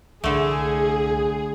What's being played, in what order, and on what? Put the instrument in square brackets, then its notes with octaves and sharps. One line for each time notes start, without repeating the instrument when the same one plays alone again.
[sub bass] C2 [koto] D3 A3 [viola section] G#4